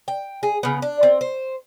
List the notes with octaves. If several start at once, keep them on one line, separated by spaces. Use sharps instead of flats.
G5
G#4
C#3 B3
D4
C4
C5